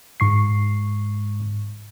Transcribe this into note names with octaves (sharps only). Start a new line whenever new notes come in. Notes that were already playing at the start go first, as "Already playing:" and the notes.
G#2 C#6 C7